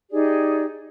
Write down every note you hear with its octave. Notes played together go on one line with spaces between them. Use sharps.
D#4 G4 G#4 D5